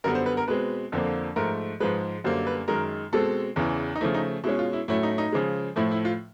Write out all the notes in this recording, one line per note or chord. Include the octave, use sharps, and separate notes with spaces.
F#2 D3 G3 B3 A#4
C5
B4
A#4
B2 G#3 C4 B4
F2 D3 F3 A#3
G#2 F3 A3 A#4
G#2 F3 G#3 B4
F#2 D3 G3 A#3 C5
B4
F#2 D#3 G#3 A#4
B2 G#3 C4 A4
E2 C#3 E3
D#4
C#3 F3 A3 E4
D#4
B2 G#3 C#4 E4
F4
E4
A2 F#3 A3 C#4 E4
D#4
D#4
C#3 F3 G#3
A2 F3 A3 E4
E4
F4